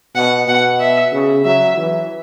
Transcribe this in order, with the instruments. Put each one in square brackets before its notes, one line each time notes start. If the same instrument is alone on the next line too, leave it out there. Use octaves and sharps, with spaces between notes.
[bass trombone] B2 [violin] F#5
[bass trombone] B2 [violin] F#5
[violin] E5
[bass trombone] C#3
[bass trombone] F#3 [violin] E5
[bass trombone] E3